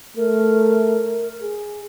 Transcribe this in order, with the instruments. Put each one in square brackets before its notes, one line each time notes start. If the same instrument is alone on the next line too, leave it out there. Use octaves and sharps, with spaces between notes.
[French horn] A3 [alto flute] A#4
[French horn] G#4